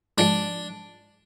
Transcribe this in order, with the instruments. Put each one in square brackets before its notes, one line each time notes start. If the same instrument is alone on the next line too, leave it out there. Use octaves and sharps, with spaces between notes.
[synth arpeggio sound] G#2 F3 G#3 [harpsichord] D4